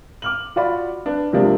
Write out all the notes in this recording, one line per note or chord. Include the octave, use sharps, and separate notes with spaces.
D6 F6 F#7
F4 F#4 D5 B5
D4 B4
C3 F3 G#3 A#3 D4 G4